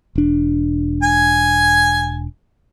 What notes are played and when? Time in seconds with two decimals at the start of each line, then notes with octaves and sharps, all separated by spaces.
0.15 E1 D4
1.03 G#5